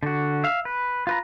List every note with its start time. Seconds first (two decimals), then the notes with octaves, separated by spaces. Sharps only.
0.03 D3 F#4
0.44 E5 F5
0.65 B4
1.07 F4 B4 A#5